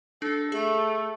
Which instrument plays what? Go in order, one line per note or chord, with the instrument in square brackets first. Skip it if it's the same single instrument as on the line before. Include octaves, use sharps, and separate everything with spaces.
[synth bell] D4 [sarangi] A4
[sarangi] A3 [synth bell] G#4